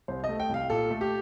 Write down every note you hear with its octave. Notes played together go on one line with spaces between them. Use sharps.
C2 C5
D#5
A3
G5
C2 F5
A#2 A4
A3
G4